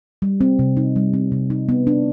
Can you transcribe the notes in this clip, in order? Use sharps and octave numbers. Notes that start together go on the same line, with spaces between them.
G3
C4
C3
D#4
G3
C4
C3
D#4
B3
D4